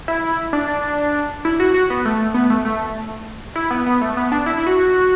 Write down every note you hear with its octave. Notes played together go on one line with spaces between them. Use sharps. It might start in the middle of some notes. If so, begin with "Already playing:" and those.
E4
D4
D4
E4
F#4
F#4
B3
A3
B3
A3
A3
E4
B3
B3
A3
B3
D4
E4
E4
F#4